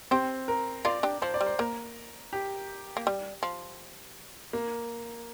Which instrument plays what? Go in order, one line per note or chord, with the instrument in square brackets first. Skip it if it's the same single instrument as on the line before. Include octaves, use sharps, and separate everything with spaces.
[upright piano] C4 [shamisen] G4 C5
[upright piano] A#4
[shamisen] F4 A#4 [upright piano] D5
[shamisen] D4 G4
[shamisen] F3 [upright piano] C5
[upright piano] D5
[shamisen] G3
[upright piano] C5
[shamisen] A#3 [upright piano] A#4
[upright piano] G4
[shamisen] A#3
G3
F3
[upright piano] A#3